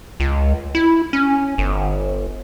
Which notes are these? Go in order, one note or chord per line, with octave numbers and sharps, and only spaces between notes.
C#2
E4
C#4
G1